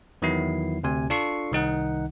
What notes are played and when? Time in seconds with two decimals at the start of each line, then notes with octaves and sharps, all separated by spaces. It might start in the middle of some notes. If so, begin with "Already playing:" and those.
0.22 E2 D#3 F#3 B3 E4 C7
0.83 D2 C3 G#5
1.10 D4 F4 A4 C#6 C7
1.52 C2 D#3 D#4 F#5